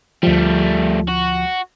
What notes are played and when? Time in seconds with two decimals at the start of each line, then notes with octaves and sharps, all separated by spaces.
0.23 D2 F3 G3 A3
1.08 F#4